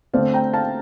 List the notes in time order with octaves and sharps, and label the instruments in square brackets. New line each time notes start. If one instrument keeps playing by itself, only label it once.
[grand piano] D3 A3 C4 [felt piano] D5 F5
[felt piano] G5 A#5
F5 A5